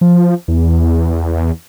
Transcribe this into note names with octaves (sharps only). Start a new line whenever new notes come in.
F3
E2